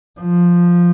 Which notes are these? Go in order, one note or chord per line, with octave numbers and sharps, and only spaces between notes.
F3